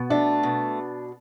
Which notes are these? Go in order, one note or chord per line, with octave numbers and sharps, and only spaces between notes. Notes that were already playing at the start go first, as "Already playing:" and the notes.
Already playing: B2
A3 D4
B2